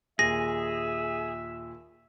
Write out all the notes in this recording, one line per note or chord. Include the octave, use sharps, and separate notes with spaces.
D#2 A#2 G#4 E5 A#6